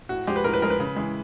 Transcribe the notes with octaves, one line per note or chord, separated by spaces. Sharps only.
A2 F#4
F3 G#3 G4
B4
A2 A#4
B4
F3 G#3 A#4
B4
C#3
E3 G#3